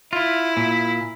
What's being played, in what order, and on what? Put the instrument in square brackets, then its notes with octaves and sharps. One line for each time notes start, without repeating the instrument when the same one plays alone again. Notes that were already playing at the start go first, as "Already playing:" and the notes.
[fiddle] E4 [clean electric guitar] F4
[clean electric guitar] A#2